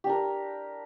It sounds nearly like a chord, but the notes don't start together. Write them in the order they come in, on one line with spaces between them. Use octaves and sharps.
G4 D4 A#4